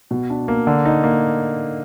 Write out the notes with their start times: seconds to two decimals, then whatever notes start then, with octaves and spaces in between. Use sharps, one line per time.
0.11 B2
0.30 D4
0.48 A#3
0.67 D3
0.85 D#4
1.03 A#3